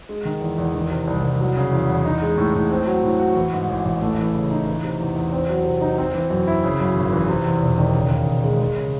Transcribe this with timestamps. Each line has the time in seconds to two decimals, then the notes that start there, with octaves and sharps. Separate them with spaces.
0.09 G#3
0.25 D#3
0.41 E2
0.58 E2
0.74 D#3
0.91 C3
1.07 C2
1.23 C2
1.40 F#3
1.56 C#3
1.72 E2
1.88 E2
2.05 D#4
2.22 G#3
2.37 A2
2.54 A2
2.71 C4
2.87 F#3
3.03 A2
3.20 F#4
3.36 E3
3.53 G#2
3.69 A1
3.85 A1
4.02 A3
4.19 E3
4.35 C#3
4.51 D#4
4.67 E3
4.84 C3
5.00 E2
5.16 E2
5.33 C4
5.49 F#3
5.65 C3
5.81 D#4
5.98 C4
6.15 E3
6.30 F#2
6.47 E4
6.64 C#3
6.80 F#2
6.96 G#1
7.13 E3
7.28 C3
7.46 E2
7.62 E1
7.78 D#3
7.94 C#3
8.11 D#2
8.27 E1
8.44 G#3
8.60 G#3
8.76 C#3